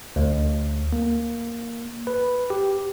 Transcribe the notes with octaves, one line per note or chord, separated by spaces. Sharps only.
D2
A#3
B4
G4